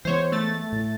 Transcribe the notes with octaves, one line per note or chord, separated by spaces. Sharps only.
E3 G#3 B3 C5 C#5
A3 A6
A2